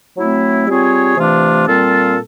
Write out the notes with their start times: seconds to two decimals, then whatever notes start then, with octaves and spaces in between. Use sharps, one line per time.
0.16 F#3 A3 C4 E4
0.67 G3 C4 F4 G#4 C#5
1.17 C3 E3 A3 D4 F4
1.67 A#2 G3 C4 F4 A4